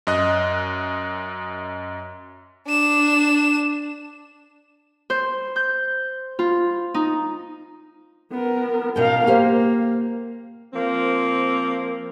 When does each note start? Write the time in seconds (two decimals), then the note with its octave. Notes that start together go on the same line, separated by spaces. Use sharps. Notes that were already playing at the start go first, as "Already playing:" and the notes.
0.07 F#2 D#5 F#6
2.67 D4 E7
5.10 C5
5.56 G6
6.39 F4
6.94 D#4
8.32 B3 A#4
8.96 B2 A#4 F5 G5
9.27 A#3 G4 C5
10.74 F3 A#3 C4